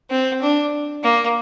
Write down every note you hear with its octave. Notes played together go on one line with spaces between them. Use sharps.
C4
D4
A#3